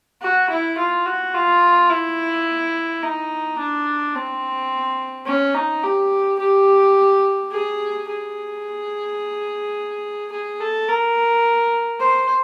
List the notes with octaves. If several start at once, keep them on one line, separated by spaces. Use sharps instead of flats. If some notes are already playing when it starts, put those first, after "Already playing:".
F#4
E4
F4
F#4
F4
E4
D#4
D4
C4
C#4
D#4
G4
G4
G#4
G#4
G#4
A4
A#4
C5